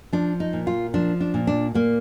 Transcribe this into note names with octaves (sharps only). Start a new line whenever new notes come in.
F3 D4
D#4
A#2
F4
F3 D4
D4
A#2
D4
A#2 A#3